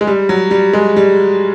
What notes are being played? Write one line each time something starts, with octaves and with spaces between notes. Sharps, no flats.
G#3
G3
F#3
G3
G#3
G3